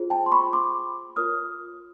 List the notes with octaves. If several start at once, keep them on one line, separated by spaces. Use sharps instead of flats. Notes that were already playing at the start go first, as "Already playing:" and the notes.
Already playing: F4 G#4 C5
G5 A5
C6
B5 C#6
C6 D6
F4 A#4 C#5 D#6 F6